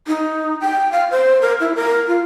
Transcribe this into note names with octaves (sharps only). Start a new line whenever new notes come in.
D#4
G5
F5
C5
A#4
E4
A#4
F4